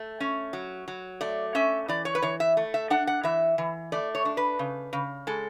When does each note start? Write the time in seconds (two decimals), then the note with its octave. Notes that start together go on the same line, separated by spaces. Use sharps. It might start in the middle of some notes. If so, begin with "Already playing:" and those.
Already playing: A3 E5
0.20 C#4
0.53 F#3
0.88 F#3
1.21 A3 D5
1.55 C#4 E5
1.88 E3 D5
2.05 C#5
2.15 B4
2.22 E3 C#5
2.40 E5
2.57 A3
2.74 E5
2.90 D4 F#5
3.07 F#5
3.23 E3 E5
3.58 E3
3.92 A3 D5
4.15 C#5
4.25 D4
4.37 B4
4.59 C#3
4.93 C#3
5.27 G#3 A4